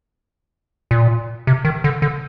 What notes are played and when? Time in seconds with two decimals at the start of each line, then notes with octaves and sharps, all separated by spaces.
0.91 A#2
1.47 C3
1.65 D#3
1.84 D3
2.02 D3